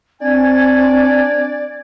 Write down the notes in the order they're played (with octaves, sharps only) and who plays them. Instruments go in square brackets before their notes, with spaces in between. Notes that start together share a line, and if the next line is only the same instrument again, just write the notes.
[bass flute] C4 [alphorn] D4 [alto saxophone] D5 [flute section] G#5 G#6